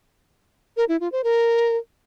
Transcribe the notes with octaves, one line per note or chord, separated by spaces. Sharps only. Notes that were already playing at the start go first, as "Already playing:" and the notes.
A#4
E4
F4
C5
A#4